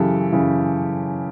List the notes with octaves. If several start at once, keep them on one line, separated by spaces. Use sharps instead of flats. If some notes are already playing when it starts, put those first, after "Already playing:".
Already playing: F#2 C#3 E3 G4 A4
F#2 C#3 E3